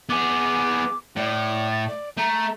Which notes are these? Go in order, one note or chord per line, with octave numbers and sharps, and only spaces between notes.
B3 G#4 D6
A2 D5
A6
D5
A3 A#5